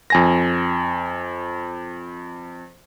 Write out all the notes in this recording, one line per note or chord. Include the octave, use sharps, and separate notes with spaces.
F2 G#5 A#6